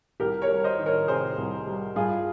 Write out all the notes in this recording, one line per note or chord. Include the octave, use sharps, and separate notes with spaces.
C2 G4 A#4
A#4 C#5
G3
C5 D#5
D#3
A#4 C#5
C3 G#4 C5
C2
G3
G2 F4 G#4